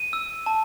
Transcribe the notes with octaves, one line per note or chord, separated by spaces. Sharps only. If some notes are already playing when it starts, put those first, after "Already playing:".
Already playing: D#7
E6
A5